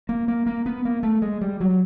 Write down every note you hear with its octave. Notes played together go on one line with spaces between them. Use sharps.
A#3
A#3
A#3
B3
A#3
A3
G#3
G3
F#3